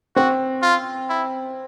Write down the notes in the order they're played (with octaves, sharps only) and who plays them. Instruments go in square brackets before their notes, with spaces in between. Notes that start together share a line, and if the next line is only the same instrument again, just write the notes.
[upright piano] C4 [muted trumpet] F#4
[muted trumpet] F4
E4